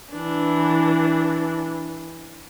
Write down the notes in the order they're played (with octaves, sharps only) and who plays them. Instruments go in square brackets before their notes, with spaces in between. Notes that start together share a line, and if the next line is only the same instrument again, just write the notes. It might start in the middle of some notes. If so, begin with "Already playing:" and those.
[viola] E3 D4